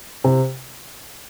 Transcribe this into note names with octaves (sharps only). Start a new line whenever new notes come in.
C3